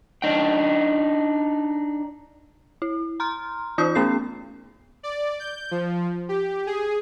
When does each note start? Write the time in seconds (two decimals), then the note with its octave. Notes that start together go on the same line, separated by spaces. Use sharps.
0.22 D4 D#4 G5
2.82 E4
3.20 A#5 C6 F6
3.78 E3 D#4 F4 C5 D#6 G6
3.95 A3 B3 C#4 G#4 C7
5.03 D5
5.39 G6
5.71 F3
6.29 G4
6.67 G#4